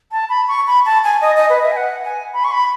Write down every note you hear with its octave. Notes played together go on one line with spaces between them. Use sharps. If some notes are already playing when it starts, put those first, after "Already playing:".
A5
B5
C#6
B5
A5
G#5
D#5
D#5
B4
E5
G#5
F#5
G#5
B5
C#6
B5